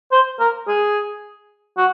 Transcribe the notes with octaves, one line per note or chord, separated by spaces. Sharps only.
C5
A#4
G#4
F#4